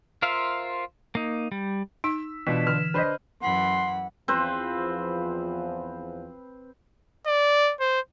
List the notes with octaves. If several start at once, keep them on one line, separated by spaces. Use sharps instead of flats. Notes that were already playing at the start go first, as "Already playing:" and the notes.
F4 A#4 C5 E5 F5
A#3 D#4
G3
D#4 E6 B6
B2 E3 D4 F4 B4
D3 F6
D4 B4 C5 D#5 C6
F#2 E3 F#5 B5 C6
E2 F3 C4 B4 C5
D5
C5